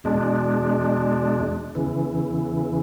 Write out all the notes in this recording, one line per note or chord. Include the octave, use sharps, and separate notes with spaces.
E2 B2 G#3 D4
E2 C#3 E3